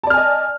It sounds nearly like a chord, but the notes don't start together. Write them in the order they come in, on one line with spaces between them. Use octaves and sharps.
A5 D5 F6 G#5 D#5